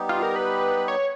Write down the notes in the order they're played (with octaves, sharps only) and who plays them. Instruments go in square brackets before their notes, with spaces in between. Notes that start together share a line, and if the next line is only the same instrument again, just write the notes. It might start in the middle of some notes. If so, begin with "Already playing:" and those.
Already playing: [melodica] G3 B3 D#4 G4
[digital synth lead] F4
A#4
B4
C#5